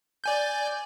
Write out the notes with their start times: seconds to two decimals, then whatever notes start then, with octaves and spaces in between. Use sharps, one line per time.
0.24 D5 G#5 G6